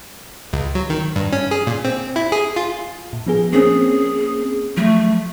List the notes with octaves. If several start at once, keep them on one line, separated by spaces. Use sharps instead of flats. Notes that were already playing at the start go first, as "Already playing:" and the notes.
C#2
F#3
D#3
G2
C#4
G#4
A#2
C4
E4
G#4
F4
A#2
F3 B3 G#4
A#3 C4 C#4 G#4
F3 F#3 A3